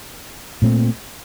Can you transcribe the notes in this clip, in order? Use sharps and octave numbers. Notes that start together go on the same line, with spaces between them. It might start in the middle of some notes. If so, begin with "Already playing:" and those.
A#2 A3 C4